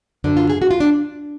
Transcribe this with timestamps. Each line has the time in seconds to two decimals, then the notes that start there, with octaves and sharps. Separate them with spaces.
0.24 F#2 D3 D4
0.37 F4
0.50 G#4
0.62 F#4
0.71 F4
0.80 D4